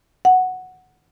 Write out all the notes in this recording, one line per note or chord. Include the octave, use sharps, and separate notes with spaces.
F#5